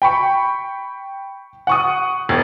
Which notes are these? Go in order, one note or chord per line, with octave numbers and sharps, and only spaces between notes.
G5 B5 C#6
F#5 C#6 D#6
E1